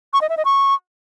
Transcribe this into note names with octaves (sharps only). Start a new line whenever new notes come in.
C#6
D#5
E5
D#5
C#6